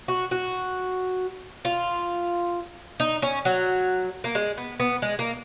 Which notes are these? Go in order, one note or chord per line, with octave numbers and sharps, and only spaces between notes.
F#4
F#4
F4
D#4
C#4
F#3
A#3
G#3
B3
B3
G#3
A#3